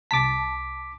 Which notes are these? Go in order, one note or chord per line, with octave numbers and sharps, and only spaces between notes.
C2 A5 D6 B6